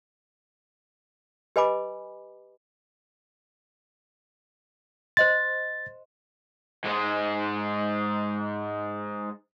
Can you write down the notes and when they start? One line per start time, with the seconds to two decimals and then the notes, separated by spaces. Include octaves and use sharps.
1.56 G4 B4 D#5 G#5 B5 D6
5.17 C5 D#5 C6 A6
6.85 G#2 G#3